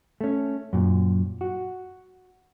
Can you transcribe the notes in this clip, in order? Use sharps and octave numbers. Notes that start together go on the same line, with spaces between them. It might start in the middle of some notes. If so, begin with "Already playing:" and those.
A3 C#4
F#2 A#2
F#4